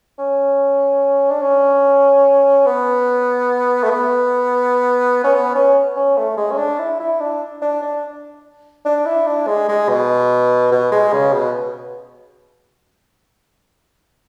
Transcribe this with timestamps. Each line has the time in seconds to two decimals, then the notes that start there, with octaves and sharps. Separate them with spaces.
0.19 C#4
1.31 D4
1.42 C#4
2.66 B3
3.84 A3
3.90 B3
5.24 C#4
5.34 B3
5.55 C#4
5.96 C#4
6.17 A3
6.37 G#3
6.52 C#4
6.58 D4
6.79 E4
7.00 E4
7.20 D4
7.62 D4
7.82 D4
8.85 D4
9.06 E4
9.27 D4
9.47 G#3
9.68 G#3
9.89 B2
10.72 B2
10.92 G#3
11.13 C#3
11.33 B2